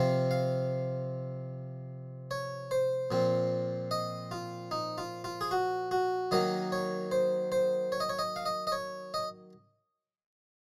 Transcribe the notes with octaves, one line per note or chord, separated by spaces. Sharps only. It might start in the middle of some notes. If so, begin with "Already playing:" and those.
Already playing: C3 F3 C4 F5
F5
C#5
C5
A#2 F3 C4
D#5
F4
D#4
F4
F4
G#4
F#4
F#4
D#3 F#3 A#3 D#4 D#5
C#5
C5
C5
C#5
D#5
C#5
D#5
F5
D#5
D#5
C#5
D#5